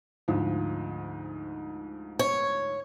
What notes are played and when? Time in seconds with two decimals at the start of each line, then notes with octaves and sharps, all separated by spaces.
0.28 D2 G#2 F3
2.19 C#5